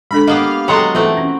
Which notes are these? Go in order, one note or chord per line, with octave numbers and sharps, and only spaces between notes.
G#3 D4 A4 B5
A#3 B3 G4 D#5 F5
F#3 G#3 A4 F#5 G5 A5 A#5 C6
E3 A3 C4 F4 A4 A5
C#4